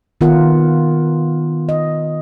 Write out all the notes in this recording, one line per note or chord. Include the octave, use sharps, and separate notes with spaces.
D#3 B3 F4 A#4 F#5
D#5